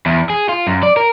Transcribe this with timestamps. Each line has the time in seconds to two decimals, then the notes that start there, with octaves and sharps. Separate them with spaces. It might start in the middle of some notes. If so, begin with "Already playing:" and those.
0.06 E2
0.30 G#4
0.49 F4
0.67 F#2
0.83 D5
0.97 A#4